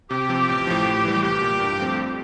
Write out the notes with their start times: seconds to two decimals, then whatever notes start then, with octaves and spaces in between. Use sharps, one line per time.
0.10 C3 G4
0.29 F3 C4
0.49 A1
0.67 A2 F3
0.86 A2
1.05 E3 G3
1.22 C2 G4
1.41 A#2 G3
1.60 G2
1.79 F3 A3 C4
1.98 F2